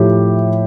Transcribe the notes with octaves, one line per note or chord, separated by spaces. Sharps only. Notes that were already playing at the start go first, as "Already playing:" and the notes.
Already playing: A2 F3 E4 G4